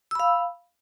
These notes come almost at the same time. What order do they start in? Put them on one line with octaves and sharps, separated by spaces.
E6 B5 F5